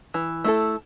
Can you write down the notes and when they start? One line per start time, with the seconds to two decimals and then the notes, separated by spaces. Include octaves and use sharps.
0.14 E3
0.44 A3 E4 A4